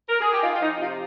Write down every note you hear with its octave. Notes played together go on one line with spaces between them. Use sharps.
A#4
G#4
G4
D#4 F4
F4
F3 D#4
C3 F4